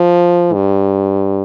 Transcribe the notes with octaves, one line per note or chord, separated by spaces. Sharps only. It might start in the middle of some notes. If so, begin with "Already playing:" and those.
Already playing: F3
G2